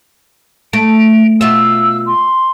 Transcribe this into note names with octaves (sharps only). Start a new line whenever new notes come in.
A3 D7
B2 F4 E5 E6
C6